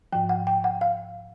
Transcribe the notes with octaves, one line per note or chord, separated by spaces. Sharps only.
G#2 F3 G5
F#5
G5
F#5
F5